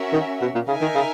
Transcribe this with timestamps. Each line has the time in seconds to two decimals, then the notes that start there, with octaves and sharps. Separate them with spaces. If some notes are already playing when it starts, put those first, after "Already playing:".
Already playing: C#4 F#4 A#4 E5
0.13 D#3
0.41 B2
0.55 A#2
0.68 C#3 D#4 A#4 E5 G#5
0.81 D#3
0.95 C#3